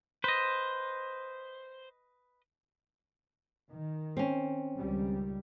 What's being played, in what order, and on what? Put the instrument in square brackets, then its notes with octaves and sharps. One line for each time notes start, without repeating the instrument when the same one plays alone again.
[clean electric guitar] B4 D#5 [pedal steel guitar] C5
[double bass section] D#3
[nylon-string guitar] C4 C#4
[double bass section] C#2 D#3 G3